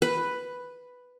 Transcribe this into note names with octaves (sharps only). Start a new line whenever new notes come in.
B4